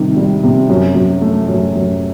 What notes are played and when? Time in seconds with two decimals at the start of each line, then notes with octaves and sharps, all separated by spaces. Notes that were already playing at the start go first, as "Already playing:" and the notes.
Already playing: C3 D#3 G3
0.16 G3
0.43 C3
0.69 F#2
0.95 F#2
1.21 A3
1.48 F#2
1.75 F#2